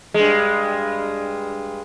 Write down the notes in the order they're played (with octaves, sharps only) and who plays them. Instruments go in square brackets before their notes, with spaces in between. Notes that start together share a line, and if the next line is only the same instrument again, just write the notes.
[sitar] G2 G#3